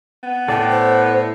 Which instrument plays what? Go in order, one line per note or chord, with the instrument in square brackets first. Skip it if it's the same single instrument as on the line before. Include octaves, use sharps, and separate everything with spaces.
[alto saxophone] B3
[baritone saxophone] A2 [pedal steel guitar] A4 D5 A5 [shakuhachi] G5
[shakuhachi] C5